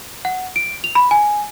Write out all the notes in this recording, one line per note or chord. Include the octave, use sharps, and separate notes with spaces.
F#5
D7
F7
B5
G#5